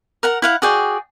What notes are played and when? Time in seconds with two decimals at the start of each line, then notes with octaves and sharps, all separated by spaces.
0.23 A#4 F#5 A#5
0.42 E4 F5 F#5
0.62 F#4 G#4 D5 G5